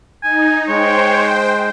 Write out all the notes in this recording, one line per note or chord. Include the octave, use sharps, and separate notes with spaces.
D#4 G#5
G#3 C5 C#5 G5